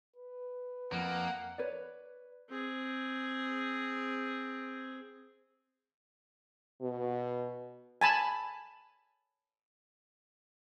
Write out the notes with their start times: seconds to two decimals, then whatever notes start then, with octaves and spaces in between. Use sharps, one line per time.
0.16 B4
0.92 F2 A#3 F#5
1.58 B4 C#5 D5
2.49 C4 G#4
6.82 B2
8.01 G#5 A5 B5